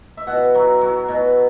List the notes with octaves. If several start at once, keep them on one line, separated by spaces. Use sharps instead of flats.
E5
B2 F#5
F#3
F#3
B2